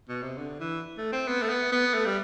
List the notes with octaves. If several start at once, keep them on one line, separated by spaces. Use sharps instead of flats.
B2
C3
D3
E3
A3
C4
B3
A3
B3
B3
A3
G3